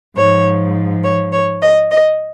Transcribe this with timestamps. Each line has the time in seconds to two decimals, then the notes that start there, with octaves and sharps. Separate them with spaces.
0.16 G#2 F3 C#5
1.03 C#5
1.32 C#5
1.62 D#5
1.91 D#5